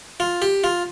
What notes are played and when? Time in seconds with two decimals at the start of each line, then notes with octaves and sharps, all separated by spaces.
0.20 F4
0.42 G4
0.64 F4